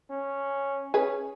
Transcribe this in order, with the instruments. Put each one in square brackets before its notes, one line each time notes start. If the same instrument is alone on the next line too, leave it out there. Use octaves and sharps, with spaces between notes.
[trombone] C#4
[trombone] C#4 [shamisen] G#4 B4